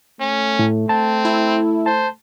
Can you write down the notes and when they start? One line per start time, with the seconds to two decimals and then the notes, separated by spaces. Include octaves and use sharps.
0.20 A3 C#4
0.59 A2
0.89 C4 A5
1.25 E4
1.86 C5 A5